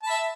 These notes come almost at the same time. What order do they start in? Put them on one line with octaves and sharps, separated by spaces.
A5 B5 E5